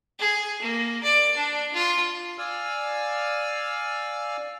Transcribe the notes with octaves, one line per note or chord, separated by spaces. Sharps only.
G#4
A#3
D5
D4
F4
D5 F5 G#5 E6 F6